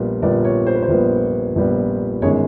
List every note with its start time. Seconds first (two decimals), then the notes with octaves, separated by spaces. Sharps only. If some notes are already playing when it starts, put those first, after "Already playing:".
Already playing: A#1 A#2 G3 B3
0.22 A#1 A#2 G3 B3 D5
0.45 C#5
0.66 C5
0.75 B4
0.83 C5
0.89 A#1 A#2 G3 B3
1.55 A#1 A#2 G3 B3
2.22 G1 D#3 G#3 C#4 C#5